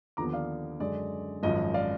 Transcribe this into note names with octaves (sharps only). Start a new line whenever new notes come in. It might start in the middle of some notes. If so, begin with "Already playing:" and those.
D#2 D3 F3 B3 A#5 D6
D5 F5
F#2 D3 G#3 D5
G#1 F#2 F3 D#5
D5 F5